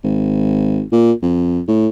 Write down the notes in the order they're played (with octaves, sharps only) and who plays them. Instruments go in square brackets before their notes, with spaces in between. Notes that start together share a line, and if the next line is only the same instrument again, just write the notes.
[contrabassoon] G#1
A#2
F2
A2